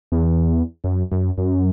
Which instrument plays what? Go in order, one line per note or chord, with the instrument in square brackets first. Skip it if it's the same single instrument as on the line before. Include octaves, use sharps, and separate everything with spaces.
[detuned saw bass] E2
F#2
F#2
F#2